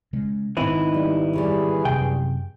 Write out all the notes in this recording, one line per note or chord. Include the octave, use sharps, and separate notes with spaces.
C#3 G#3
G#2 D#3 B3 C4 D#4 E4
G3
G2 C#3 E3 G3 G#4
F#2 C3 G5